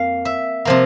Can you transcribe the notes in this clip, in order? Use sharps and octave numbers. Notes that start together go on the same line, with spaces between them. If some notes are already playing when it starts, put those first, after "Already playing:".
Already playing: F2 A#3 F5
E5
C3 F3 A#3